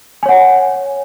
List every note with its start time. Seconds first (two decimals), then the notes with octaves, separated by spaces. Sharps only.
0.23 G#5
0.26 C#5
0.29 F#5